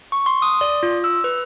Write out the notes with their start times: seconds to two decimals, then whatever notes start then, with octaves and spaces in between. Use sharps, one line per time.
0.12 C#6
0.26 C6
0.42 D#6
0.61 D5
0.83 F4
1.04 E6
1.24 B4